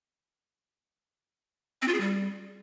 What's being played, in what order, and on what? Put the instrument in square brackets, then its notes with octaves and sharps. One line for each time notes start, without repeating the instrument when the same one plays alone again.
[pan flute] C4
F4
G#4
G3